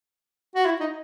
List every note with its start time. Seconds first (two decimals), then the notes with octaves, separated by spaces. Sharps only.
0.55 F#4
0.66 E4
0.80 D#4